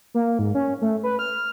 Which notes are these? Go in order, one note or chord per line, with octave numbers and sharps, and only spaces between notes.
A#3
G#2
C#4
A3
B4
F6